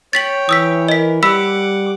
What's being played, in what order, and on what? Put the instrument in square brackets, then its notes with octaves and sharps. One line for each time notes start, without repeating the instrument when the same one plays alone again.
[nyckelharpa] C#5 G5 [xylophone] A6 B6 F#7
[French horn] E3 [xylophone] D#6 E6 B6
[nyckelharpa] A#4 [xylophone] D#5 B6
[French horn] G3 [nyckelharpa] F#5 D6 [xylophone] B5 E6 B6